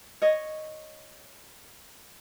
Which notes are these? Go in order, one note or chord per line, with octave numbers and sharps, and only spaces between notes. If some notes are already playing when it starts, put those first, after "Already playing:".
C#5 D#5